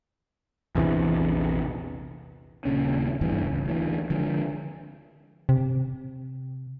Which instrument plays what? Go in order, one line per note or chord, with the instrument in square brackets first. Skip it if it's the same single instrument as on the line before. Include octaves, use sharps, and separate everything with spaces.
[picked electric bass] A#1 E2 C3 E3
[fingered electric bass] D#1 A#2 C#3 C#4
G#1 E2 G2 E3
C#2
D2 E3
D3 F3 G#3
[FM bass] C3